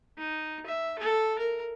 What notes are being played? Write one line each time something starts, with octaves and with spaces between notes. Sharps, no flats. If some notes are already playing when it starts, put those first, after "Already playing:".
D#4
E5
A4
A#4